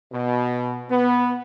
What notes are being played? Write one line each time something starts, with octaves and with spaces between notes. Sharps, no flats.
B2
B3